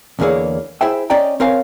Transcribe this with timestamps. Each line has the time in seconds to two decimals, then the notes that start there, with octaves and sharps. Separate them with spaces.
0.19 E2 D3 E3 A#3 G#4 C#5
0.81 E4 G#4 C5 E5 G5
1.10 C#4 D5 D#5 G5 A#5
1.40 C4 A#4 C#5 F5 G#5